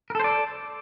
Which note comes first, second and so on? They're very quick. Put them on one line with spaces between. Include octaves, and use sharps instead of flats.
A#4 A4 C5 D5